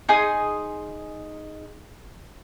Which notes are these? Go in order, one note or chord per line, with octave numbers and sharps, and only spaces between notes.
D#4 G#4 C6 D#6